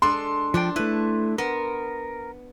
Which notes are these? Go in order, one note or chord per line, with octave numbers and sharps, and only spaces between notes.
G#3 D4 A4 C6
F3 D4 C5 G5
A3 E4 B4
B3 A#4